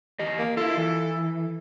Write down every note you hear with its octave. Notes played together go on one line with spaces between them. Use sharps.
E2 G4 D#5
A#3
E4 F4 A4
E3